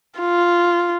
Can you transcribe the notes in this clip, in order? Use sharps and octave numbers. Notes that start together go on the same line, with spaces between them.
F4